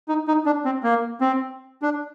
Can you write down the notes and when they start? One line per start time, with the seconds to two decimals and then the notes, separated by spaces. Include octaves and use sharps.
0.08 D#4
0.28 D#4
0.46 D4
0.65 C4
0.83 A#3
1.21 C4
1.82 D4